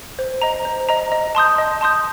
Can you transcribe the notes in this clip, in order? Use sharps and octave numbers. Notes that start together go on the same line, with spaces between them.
C5
D#5 A#5
C5
D#5 A#5
D#5
A5 C6 D#6 G6
D#5
A5 C6 D#6 G6